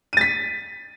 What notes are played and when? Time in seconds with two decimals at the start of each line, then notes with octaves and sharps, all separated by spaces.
0.13 D#7
0.17 A6
0.21 B6